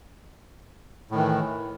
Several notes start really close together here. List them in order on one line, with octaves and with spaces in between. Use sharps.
A2 D#3 E3